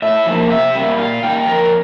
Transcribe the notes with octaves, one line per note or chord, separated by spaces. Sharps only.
A2 E5
F3 A#3
C3 E5
G3 A#3
A#2 F5
G3 A#3 G5
F2 A#4